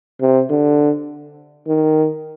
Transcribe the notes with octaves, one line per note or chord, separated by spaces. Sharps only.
C3
D3
D#3